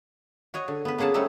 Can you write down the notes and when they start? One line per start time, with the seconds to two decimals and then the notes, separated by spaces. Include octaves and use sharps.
0.54 F#4 C#5 D#5
0.68 D3
0.85 B3 B4
0.98 A#3 C#4 G#4 F#5 A5
1.14 G3 A3 C4 C#4 D#4 A4